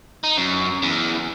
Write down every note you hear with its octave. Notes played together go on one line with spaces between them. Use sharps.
D#4
F#2
E2